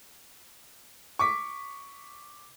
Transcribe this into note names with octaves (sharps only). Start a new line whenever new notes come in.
C#6 D6 B6